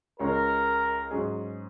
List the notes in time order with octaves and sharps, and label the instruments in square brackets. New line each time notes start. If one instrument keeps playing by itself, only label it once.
[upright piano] C#2 C#3 G#3 C#4 [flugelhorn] A#4
[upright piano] G#2 F#3 C#4 G#4